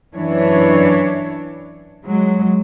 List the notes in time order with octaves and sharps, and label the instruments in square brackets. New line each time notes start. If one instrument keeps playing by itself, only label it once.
[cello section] F#2 E3 D4 C#5
F#3 G#3